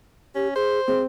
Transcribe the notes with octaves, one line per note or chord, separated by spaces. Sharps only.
C#4 G4
G#4 C5
C4 G#4